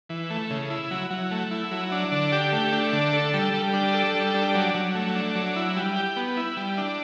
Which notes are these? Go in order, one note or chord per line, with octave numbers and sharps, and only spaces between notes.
E3
A3
C#3
E4
F#3
F#3
A3
E4
F#3
D4
D3
G4
A3
D4
D3
A4
G3
G3
D4
A4
G3
D4
F#3
F#3
A3
D4
F#3
E4
G3
G4
B3
E4
G3
D4